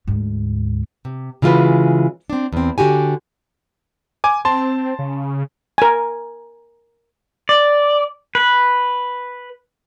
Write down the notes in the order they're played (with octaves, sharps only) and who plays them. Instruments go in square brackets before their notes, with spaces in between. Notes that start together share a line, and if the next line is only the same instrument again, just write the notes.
[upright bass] D2 G#2
[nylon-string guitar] C3
C#3 E3 G#3 F4 F#4 B4
C4 D4
E2 C4
D3 F#4 G4 G#5
[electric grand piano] G#5 D6
[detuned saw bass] C4 [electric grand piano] A5 C6
[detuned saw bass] C#3
[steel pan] A#4 G#5
[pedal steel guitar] D5
B4